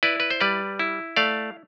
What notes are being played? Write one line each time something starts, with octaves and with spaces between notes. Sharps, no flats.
E4 B4 D5
B4
C5
G3 B4 D5
E4
A3 D5 F5